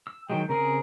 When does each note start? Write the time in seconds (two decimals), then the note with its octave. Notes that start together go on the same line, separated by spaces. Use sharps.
0.07 E6
0.30 D#3 F#3 G#3 G5
0.49 C#3 C4 G#4 A#4